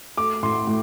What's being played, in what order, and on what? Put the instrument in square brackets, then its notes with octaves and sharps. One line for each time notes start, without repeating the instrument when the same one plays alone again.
[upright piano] A3 D6
A2 C6
A2